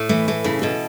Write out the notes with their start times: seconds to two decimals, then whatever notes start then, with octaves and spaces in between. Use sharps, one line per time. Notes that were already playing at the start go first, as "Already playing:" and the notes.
Already playing: A2
0.09 E3 A3
0.28 E3 A4
0.44 C#3 E4
0.62 B2 A4